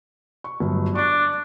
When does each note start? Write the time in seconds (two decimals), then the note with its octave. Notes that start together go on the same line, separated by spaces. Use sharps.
0.44 C#6
0.60 G1 F#3
0.95 D4 C#6 F#6